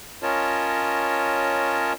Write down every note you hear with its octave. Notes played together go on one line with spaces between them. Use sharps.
C#4 F4 A#4 C#5 D#5 A5